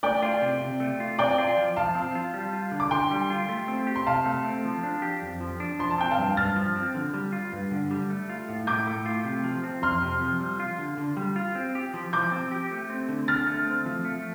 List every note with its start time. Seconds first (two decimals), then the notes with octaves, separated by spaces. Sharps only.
0.03 A3 D5 G5
0.22 F4
0.42 C3
0.61 C3
0.80 A3
1.00 F4
1.18 C4 D5 G5
1.38 F4
1.57 F3
1.76 F3 F5 A5
1.95 C4
2.15 F4
2.34 G3
2.53 F4
2.72 D3
2.80 D6
2.91 D3 G5 C6
3.11 G3
3.30 F4
3.49 A3
3.68 C4
3.87 G4
3.96 C6
4.07 C3 F5 A5
4.26 A3
4.45 C4
4.65 F3
4.83 D4
5.02 G4
5.22 F2
5.40 F3
5.60 D4
5.79 F3 C6
5.90 A5
5.98 C4 G5
6.11 F5 A5
6.18 G2
6.37 G2 F6 A6
6.56 F3
6.75 C4
6.94 D3
7.13 G3
7.32 F4
7.53 G2
7.71 D3
7.91 G3
8.10 A3
8.29 F4
8.49 A2
8.67 A2 D6 G6
8.87 A3
9.06 F4
9.25 C3
9.44 F3
9.64 C4
9.82 F2 C6 F6
10.02 C3
10.21 F3
10.40 G3
10.60 F4
10.78 D3
10.98 D3
11.17 G3
11.36 F4
11.55 C4
11.75 G4
11.94 F3
12.13 F3 D6 G6
12.32 C4
12.51 G4
12.71 A3
12.90 C4
13.09 D3
13.28 D3 F6 A6
13.47 A3
13.67 C4
13.86 F3
14.05 A3